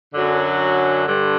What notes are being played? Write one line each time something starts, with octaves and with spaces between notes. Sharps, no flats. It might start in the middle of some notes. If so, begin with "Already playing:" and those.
F#2 D3 F#3
G2 D3